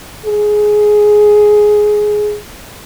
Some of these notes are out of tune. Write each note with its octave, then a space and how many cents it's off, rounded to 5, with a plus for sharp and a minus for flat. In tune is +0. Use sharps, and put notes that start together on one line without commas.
G#4 +10